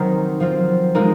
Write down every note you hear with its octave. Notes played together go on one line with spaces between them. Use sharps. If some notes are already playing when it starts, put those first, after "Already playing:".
Already playing: D#3 F#3 C4 D#4 A#4
F3 C4 F4
F3 G#3 C4 D#4 A#4